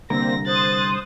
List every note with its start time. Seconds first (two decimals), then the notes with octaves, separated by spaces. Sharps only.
0.10 C2 D3 A#3 C4 A#4 A#6
0.46 C5 D#6 F#6 A6